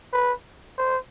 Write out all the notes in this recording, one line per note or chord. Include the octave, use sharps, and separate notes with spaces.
B4
C5